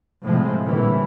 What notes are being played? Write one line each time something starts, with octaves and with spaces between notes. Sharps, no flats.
A2 C3 F3 G#3
A#1 F2 A2 D3 E3 G3